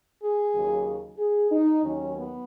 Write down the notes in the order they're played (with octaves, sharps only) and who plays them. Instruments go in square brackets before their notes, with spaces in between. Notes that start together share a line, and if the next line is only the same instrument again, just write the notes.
[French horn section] G#4
D#2 C#3 F#3
G#4
D#4
D#2 D#3 F#3 C#4
B3